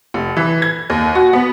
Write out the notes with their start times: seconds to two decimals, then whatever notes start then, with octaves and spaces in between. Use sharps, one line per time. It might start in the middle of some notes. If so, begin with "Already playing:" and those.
0.14 F1
0.37 E3
0.62 G#6
0.90 D#2
1.15 F#4
1.33 B3